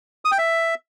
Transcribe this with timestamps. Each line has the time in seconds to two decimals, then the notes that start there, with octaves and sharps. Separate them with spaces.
0.25 D#6
0.32 G5
0.38 E5